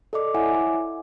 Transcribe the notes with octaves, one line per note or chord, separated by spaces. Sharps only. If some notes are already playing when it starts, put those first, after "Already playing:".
A4 D5 D#5 D6
E4 C#5 E5 F#5 G#5 D6